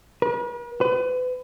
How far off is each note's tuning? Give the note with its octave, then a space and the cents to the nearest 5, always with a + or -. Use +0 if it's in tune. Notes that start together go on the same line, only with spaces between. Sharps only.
B4 -45
B4 +35